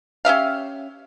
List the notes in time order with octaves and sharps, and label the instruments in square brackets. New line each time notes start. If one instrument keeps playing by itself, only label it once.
[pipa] C#4 G4 E5 F5